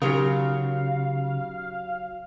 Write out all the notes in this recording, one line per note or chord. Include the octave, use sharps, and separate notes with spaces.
C#3 F#3 D#4 G4 A#4 F5 D#6